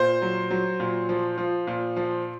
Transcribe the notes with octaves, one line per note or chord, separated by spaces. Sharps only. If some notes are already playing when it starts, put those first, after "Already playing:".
Already playing: A#2 C5
F#3
F#3
A#2
F3
F3
A#2
F3